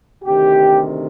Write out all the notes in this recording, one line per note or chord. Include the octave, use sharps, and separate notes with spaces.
D2 C3 D#3 G4